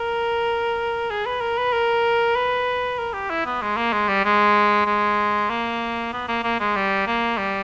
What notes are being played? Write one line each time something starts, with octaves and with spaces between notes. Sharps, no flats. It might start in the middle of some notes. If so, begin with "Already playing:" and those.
Already playing: A#4
G#4
B4
A#4
B4
A#4
B4
A#4
G4
E4
B3
G#3
A#3
G#3
G3
G#3
G#3
A#3
B3
A#3
A#3
G#3
G3
A#3
G3